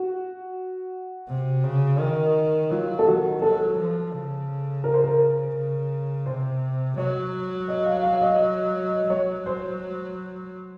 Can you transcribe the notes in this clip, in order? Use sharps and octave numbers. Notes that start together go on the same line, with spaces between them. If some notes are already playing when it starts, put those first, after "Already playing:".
Already playing: F#4
C3
C#3
D#3
F#3 F4
A4
D#3 F#4
F#3 A4
F3
C#3
A#4
C5
A#4
C#3
C3 C5
F#3 C#5
D#5
F5
F5
D#5
F#3 C#5
C5